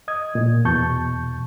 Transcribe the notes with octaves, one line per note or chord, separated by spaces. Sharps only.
D#5 D#6 G#6
A#2
E2 B2 A5 C#6 G6